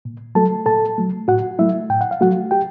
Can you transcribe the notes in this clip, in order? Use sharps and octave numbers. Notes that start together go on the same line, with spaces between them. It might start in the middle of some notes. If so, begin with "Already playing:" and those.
A#2
F#3 A3 A4 A5
A#2 A4 A5
F#3 A3
A2 F#4 F#5
F#3 A3 E4 E5
A2 G5
F#5
F5
F#3 A3 F#4 F#5
G4 G5